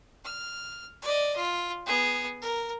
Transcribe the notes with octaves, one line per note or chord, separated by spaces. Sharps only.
F6
D5 D#5
F4
B3 G#4
A#4